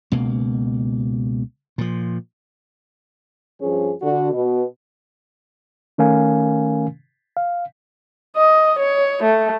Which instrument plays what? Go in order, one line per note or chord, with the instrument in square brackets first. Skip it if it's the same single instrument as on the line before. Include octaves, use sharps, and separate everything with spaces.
[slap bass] C#2 B2 A#3
A#2 F3
[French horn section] G2 F3 C#4 G#4
D3 F#4
B2
[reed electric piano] D#3 A3 C#4 A#4 F5 G#5
F5
[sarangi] D#5
C#5
A3